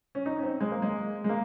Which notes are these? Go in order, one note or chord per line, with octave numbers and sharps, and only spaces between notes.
C#4
D#4
C#4
C4
G#3
A#3
G#3
G#3
A#3